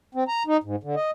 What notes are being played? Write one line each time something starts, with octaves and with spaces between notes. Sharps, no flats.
C4
A#5
D#4
G#2
D3
D#5